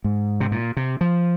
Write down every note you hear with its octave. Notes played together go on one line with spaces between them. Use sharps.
G#2
C3
A#2
C3
F3